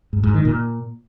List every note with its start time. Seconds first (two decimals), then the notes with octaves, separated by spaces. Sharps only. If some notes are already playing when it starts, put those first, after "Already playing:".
0.13 G#2
0.24 G#2
0.34 D#3
0.45 A#2